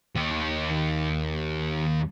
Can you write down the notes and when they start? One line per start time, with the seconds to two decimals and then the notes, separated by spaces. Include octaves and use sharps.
0.16 D#2 D#3